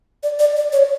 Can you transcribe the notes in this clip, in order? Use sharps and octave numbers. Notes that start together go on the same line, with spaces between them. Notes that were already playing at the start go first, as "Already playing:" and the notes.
D5
D5
D5
C#5